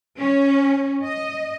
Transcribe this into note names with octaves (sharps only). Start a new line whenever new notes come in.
C#4
D#5